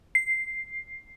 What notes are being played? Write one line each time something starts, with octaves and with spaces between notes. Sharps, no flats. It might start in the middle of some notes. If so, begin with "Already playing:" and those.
C7